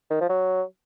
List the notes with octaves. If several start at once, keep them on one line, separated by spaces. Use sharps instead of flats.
D#3
F3
F#3